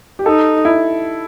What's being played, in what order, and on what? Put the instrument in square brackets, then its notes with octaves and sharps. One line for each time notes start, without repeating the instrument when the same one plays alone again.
[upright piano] G4
[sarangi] D#4 [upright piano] A4
[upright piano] E4